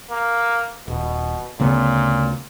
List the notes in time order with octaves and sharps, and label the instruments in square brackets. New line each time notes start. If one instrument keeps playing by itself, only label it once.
[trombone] A#3
[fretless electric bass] D#1 [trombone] B2
[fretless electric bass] D2 C#3 B3 [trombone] A#2